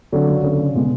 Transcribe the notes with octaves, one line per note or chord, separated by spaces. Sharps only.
D3 F#3
C#2
D3 C#4
C#3
B2 G#3